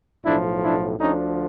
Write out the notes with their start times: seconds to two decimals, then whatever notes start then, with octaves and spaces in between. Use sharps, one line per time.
0.24 B1 A2 F3 D4 E4
0.62 D4 E4
0.98 D2 D3 F3 C#4 D#4